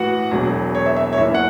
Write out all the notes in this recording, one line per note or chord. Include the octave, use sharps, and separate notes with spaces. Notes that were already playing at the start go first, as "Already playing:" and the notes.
Already playing: A1 A2 E3 F#4 B4 F#5
E1 E2 B2 F#3
C#5
E5
E5
C#5
F#1 E2 E3 E5
F#5